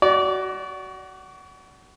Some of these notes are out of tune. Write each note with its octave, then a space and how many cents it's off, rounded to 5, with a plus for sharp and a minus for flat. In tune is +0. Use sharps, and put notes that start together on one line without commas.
F#4 +20 D5 -25